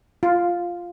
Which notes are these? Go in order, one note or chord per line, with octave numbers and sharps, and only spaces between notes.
F4